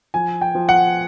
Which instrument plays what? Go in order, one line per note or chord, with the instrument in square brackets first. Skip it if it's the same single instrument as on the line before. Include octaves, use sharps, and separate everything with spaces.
[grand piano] F3 G#5
G5
F3
F#5